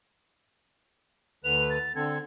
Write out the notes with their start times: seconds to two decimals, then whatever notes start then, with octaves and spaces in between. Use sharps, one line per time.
1.44 D2 D3 B4 F7
1.70 A6
1.95 D3 C4 A4 G#6